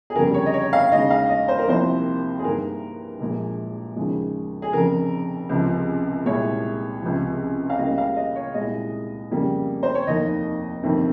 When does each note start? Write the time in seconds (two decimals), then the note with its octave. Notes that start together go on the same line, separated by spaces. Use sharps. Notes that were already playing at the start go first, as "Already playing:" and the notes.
0.10 G#4
0.15 G1 F2 C#3 G3 A#4
0.34 C#5
0.46 D#5
0.54 C#5
0.73 F5
0.91 D#2 C#3 G#3 D#5
1.10 F5
1.30 D#5
1.48 C5
1.59 A#4
1.68 C2 C3 F3 A#3 C5
2.39 G#4
2.44 G2 D#3 A#3 A#4
3.20 A#1 A#2 G#3
3.96 D#2 C#3 F3 G#3
4.62 G#4
4.73 F1 F2 C#3 A#4
5.49 C#2 C3 F3
6.25 C2 A#2 G#3 C#5
7.01 C#2 C3 F3
7.70 F5
7.78 C#2 C#3 G3 A#3 D#5
7.98 F5
8.16 D#5
8.36 C#5
8.54 C2 A#2 G#3 D#5
9.31 F2 C#3 G3 A#3
9.83 C5
9.95 C#5
10.07 F1 D#2 D#3 A#3 D#5
10.83 G1 F2 C3 D#3 A#3